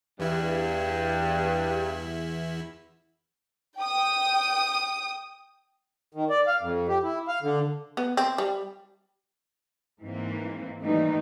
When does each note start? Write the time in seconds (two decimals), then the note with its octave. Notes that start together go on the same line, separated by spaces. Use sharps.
0.20 E2 G2 E4
3.77 G5 D#6
6.15 D#3
6.30 D5
6.47 F5
6.62 F2
6.89 G4
7.03 E4
7.28 F5
7.43 D3
7.97 B3
8.17 C4
8.38 G3
10.02 G#2 E3 A#3 C4
10.82 D#3 E3 G3 A3 A#3 D#4